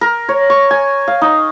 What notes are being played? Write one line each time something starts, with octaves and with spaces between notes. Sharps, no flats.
A#4
C#5
C#6
G#5
F5
D#4